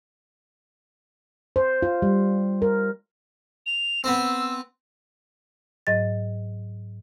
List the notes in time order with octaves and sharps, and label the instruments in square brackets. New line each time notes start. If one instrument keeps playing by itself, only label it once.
[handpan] C5
F4
G3
A#4
[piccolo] F7
[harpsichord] B3 C4 [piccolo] E6
[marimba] G#2 F#3 D#5 A6